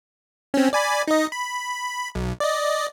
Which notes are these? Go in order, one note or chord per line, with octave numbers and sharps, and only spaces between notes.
C4 C#4
D5 G#5 B5
D#4 D#5
B5
B1
D5 D#5